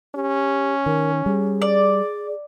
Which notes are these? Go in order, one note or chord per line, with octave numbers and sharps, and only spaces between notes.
C#4 G4
D#3 A#4
G3 G#4
D5